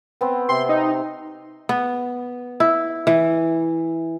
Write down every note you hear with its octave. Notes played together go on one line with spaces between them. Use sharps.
B3 C4
C3 C6
D#4
B3
E4
E3